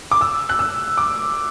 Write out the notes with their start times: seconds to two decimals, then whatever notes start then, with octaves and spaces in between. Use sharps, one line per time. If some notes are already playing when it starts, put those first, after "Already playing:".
0.11 D6
0.21 E6
0.49 F#6
0.59 E6
0.98 D6